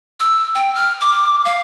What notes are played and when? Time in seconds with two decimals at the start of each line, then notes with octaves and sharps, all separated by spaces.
0.20 E6
0.55 G5
0.75 F6
1.01 D6
1.45 F5